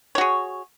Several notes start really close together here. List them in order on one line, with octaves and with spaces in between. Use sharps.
C#5 F#4 G#4